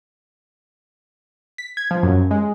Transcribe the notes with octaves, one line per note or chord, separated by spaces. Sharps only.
B6
G#6
F3
F#2
G#3